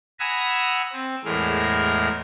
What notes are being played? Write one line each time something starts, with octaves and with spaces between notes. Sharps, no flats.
F#5 G#5 A#5 B5 D#6 E6
C4
E2 A2 G#3 A#4